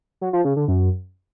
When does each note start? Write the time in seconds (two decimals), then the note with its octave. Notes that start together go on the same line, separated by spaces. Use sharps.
0.21 F#3
0.33 F3
0.45 C#3
0.56 D3
0.68 F#2